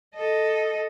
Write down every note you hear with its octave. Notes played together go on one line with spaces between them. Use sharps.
A4 D#5